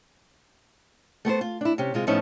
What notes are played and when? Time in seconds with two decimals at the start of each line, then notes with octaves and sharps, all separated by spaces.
1.25 A3 B3 A4 C5
1.41 F4
1.61 D4 E4
1.78 C3 C#4 G4
1.94 C3 G#3 F4
2.07 A2 F3 B3 C#4 D#4 E4